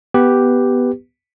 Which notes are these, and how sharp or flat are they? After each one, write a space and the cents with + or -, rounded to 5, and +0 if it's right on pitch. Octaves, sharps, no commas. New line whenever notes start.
B3 +0 G4 +0 B4 +0